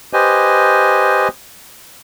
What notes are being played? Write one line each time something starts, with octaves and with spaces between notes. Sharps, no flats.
G4 B4 C5 D#5 G#5